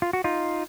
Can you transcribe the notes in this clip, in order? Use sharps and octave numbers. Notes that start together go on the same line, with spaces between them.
F4
F#4
D#4 F4